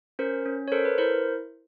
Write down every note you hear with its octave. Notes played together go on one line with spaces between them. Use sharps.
C#4 A#4 C5
C#4
C#5
A4 A#4 C5
B4
E4 A#4 C5